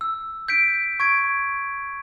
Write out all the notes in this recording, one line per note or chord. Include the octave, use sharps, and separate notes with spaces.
E6
G6 B6 D7
C#6 G#6 D7